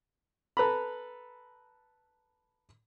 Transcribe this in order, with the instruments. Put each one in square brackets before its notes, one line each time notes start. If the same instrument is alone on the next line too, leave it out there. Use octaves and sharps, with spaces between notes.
[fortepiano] A4 B4 A#5 B5